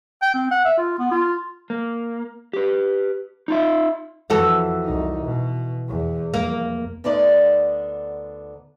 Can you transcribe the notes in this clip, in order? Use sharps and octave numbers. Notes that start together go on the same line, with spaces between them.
G5
C4
F#5
E5
F4
B3
F4
A#3
G4 B4
D#4 F4 E5
F2 E3 F#4 A4
C2 D#4
B2
E2
F1 A#3
D2 D3 B3 D4 D#4 D5